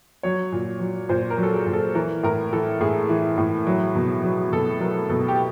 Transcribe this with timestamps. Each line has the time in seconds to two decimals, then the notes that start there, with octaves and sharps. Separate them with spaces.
0.23 F#3 C#5
0.52 A#2
0.80 F#3
1.09 A#2 C5
1.30 A#4
1.38 F#3
1.43 A4
1.52 G#4
1.66 A#2
1.73 A4
1.95 E3 A#4
2.23 A2 A#4
2.53 E3 A4
2.80 A2 G#4
3.09 E3
3.38 A2
3.67 F#3
3.95 B2
4.24 F#3
4.52 B2 A4
4.80 F#3 A#4
5.09 B2 A4
5.28 G4